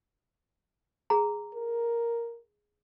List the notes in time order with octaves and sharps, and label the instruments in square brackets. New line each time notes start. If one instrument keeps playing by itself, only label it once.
[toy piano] G#4 A#5
[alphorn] A#4